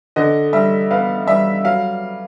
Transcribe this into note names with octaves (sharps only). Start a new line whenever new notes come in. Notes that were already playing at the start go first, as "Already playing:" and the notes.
D3 D#5
G3 E5
B3 F5
G3 E5
F#3 F5